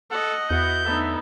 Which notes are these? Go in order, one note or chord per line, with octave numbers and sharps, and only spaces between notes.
A4 D#5 F#5
E2 B3 E4 F#4 G6
D2 B3 D#4 A4 E5